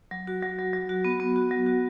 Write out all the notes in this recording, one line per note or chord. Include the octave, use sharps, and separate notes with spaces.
F#3
F#4
F#3
F#3
F#3
F#4
B3
B3
F#4
F#3
F#4